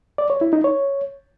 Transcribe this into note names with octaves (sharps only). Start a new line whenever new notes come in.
D5
C#5
E4
D#4
C#5